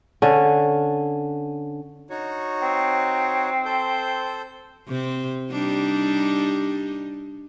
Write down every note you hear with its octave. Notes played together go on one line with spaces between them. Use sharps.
D3 C#4
D#4 F#4 C#5
C4
A4 C5 G6
C3 C4
G3 D4 D#4